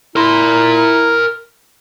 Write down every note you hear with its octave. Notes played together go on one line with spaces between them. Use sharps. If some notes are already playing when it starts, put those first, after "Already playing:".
E4 A#4 A#5 C6